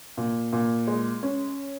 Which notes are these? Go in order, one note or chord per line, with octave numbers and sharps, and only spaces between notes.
A#2
A#2
G#3
C#4